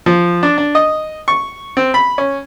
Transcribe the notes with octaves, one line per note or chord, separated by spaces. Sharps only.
F3
D4
D4
D#5
C#6
C4
B5
C#4